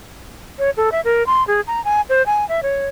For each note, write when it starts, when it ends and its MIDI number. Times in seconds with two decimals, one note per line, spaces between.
0.59 0.70 73
0.77 0.90 69
0.92 1.01 76
1.05 1.25 70
1.27 1.45 84
1.47 1.61 68
1.67 1.83 82
1.85 2.01 80
2.09 2.25 72
2.26 2.47 80
2.49 2.61 76
2.63 2.87 73